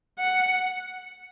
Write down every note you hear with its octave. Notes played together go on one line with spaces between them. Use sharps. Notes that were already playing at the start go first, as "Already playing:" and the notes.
F#5